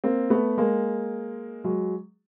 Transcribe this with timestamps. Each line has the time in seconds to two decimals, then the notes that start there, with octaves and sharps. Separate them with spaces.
0.04 A#3 C4
0.30 A3 B3
0.58 G#3 A#3
1.64 F#3 G#3